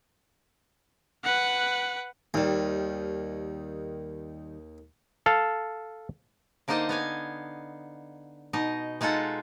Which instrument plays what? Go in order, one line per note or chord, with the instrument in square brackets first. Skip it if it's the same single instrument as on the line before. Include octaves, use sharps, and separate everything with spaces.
[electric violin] B4 F#5
[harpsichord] D#2 [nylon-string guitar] D#3 G3
[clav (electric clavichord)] A4 F5 A5
[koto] D3 A#3 D#4 C5 D#5 A5
B3 F5 G#5
B2 D#4 D#5
G#3 D#4 F4 A4 F#5